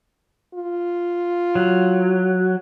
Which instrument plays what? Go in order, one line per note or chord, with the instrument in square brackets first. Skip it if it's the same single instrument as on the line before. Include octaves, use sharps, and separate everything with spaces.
[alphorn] F4
[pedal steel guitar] F#3